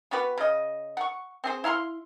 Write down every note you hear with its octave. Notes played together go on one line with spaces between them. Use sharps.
B3 F#4 G4 B4
C#3 D#5
F#5 C#6
C4 G#4 C5
E4 F5 A#5 C6